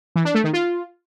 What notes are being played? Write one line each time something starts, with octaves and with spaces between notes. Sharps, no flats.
E3
D4
A3
D#3
F4